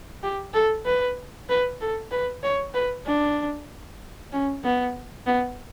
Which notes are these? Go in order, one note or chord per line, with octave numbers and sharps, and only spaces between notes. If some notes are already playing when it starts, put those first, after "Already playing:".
G4
A4
B4
B4
A4
B4
C#5
B4
D4
C#4
B3
B3